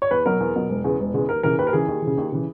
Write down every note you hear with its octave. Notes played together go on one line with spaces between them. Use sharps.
C#5
E2 B4
B2 F#3 A#4
E2
B2 F#3
E1
E2 C#3 G#3
E1
E2 C#3 G#3
D#2 A#4
C#3 E3 A#4
D#2 B4
A#4
C#3 E3 G#4
D#2
C#3 E3
D#2
C#3 E3